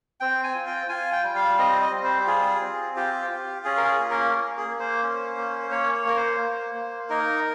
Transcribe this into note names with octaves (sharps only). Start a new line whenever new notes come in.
C4 G5
G#5
F4
G5
F4 G#5
G5
G3
F5
C4 D#5
D#5
G3
C5
G4
F4 G#4
C4
F4 G4
F4
C#4 G#4
A#4
G#4
A#3
A#4
A#3
G#4
A#3
C5
C#4
A#3
C5
A#3 C#5
C#5
A#3 A#4
C5
A#3
A#3
D#4 A#4